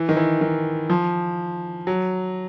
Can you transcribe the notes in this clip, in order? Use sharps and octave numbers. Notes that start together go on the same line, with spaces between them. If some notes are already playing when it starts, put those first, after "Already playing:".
Already playing: E3
D#3
E3
D#3
F3
F#3